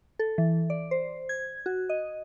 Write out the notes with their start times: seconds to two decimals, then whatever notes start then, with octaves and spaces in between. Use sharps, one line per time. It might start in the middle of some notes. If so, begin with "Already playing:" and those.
0.19 A4
0.38 E3
0.70 D5
0.91 C5
1.29 G#6
1.66 F#4
1.90 D#5